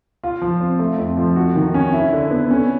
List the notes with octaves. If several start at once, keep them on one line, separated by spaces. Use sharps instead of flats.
F4
F3
C4
A3
F2
F3
F#4
D#3
C#4
E4
D3
B3
C#4